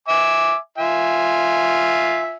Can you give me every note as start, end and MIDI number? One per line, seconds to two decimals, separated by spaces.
0.08 0.56 76
0.08 0.56 80
0.08 0.56 86
0.78 2.36 65
0.78 2.36 76
0.78 2.36 80